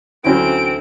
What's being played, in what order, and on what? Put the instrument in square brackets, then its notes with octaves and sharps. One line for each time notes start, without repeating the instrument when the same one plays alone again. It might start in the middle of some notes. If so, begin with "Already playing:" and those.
[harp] D2 [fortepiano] F#3 C#4 E4 [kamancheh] C4 [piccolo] D7